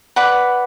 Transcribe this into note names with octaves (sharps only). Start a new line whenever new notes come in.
B4 D5 F#5 B5